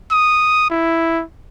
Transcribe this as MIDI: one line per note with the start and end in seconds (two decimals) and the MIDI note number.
0.11 0.65 87
0.70 1.23 64